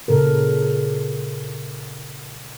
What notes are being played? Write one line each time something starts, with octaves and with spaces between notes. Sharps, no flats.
A#2 C#3 A4 A#4